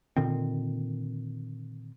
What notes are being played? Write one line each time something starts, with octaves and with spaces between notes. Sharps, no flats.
A#2 D3 D#3 C4